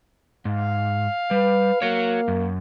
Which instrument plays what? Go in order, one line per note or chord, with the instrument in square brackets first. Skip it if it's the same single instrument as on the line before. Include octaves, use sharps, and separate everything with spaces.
[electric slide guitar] G#2 [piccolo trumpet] F5
[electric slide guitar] G3 [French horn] B4
[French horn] A#3 [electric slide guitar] F#4 C#5
[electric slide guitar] F#2